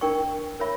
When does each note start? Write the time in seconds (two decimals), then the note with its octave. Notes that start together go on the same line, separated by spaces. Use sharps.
0.01 D4 A#4 D5 G5 C#6
0.59 A#4 C#5 E5 B5